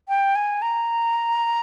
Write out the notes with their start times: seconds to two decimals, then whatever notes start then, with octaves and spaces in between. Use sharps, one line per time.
0.08 G5
0.36 G#5
0.62 A#5